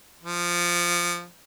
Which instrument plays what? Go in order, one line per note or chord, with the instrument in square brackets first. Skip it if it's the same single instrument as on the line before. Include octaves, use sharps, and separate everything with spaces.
[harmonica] F3